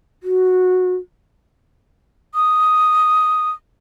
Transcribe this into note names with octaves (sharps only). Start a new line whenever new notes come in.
F#4
D#6